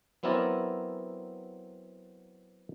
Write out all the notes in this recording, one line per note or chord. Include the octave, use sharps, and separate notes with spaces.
F#3 B3 C4 E4 A#4 D5